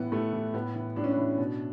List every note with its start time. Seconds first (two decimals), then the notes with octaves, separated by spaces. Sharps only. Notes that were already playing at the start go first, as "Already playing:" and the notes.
Already playing: A2 E3 B3
0.12 A2 A3
0.33 E3
0.54 A2 B3
0.76 E3
0.96 A2 D4
1.04 C#4
1.11 D4
1.17 E3
1.38 B2